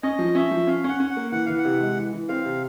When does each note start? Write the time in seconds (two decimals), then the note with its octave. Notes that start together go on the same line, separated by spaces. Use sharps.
0.03 C#4 D#5
0.19 F3
0.35 C#4 E5
0.51 F3
0.67 C#4 F5
0.84 C#4 F#5
1.00 C#4
1.10 F#5
1.17 A#3
1.32 E3 F#5
1.46 E3 F5
1.58 F#5
1.65 C3
1.81 G#3
1.97 E3
2.13 E3
2.29 C4 F5
2.45 C3